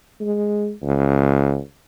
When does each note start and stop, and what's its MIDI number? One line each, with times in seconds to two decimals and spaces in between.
0.21 0.72 56
0.83 1.59 37